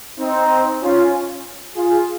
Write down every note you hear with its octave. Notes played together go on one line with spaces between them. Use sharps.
C4 D#4
C#4 F4
F4 G#4